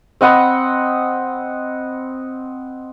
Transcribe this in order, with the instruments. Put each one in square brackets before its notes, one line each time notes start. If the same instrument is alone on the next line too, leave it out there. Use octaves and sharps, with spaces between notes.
[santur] C4 D#5 F#5 B5